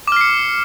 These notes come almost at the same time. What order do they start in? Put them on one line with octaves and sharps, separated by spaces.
D6 F6 C7 C#7